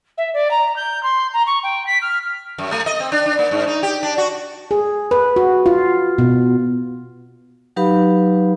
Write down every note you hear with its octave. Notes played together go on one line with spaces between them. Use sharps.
E5
D5
A#5
G6
C6
A#5
C#6
G5
B6
F6
F#2
A3
D#5
C4
D4
D4
A#3
G#2
D#4
G4
D4
F#4
G#4
B4
F#4
F4
B2
F#3 D#4 G4 B4 F5 B5